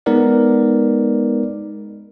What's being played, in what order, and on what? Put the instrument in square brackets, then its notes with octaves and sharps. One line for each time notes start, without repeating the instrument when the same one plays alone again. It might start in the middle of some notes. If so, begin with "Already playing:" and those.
[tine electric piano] G#3 B3 D#4 A#4 B4 D5